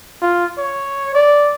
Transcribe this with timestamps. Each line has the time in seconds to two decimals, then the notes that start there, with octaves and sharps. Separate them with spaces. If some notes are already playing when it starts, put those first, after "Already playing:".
0.22 F4
0.58 C#5
1.15 D5